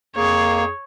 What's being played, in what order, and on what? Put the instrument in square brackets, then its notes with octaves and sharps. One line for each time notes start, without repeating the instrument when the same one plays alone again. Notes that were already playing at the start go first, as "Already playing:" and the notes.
[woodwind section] F2 G#4 [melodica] A#3 [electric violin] C#5